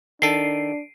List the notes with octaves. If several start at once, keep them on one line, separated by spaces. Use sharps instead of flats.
D#3 D4 A4 C7 D7 D#7